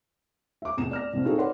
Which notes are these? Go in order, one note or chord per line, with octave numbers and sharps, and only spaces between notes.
E5 D6
F1 E2 E7
D5 F6 A#6
C2 F2 A#2
C4 D#4 F4 F#4 G#4 A4
B4 C#5 D5 F#5 C6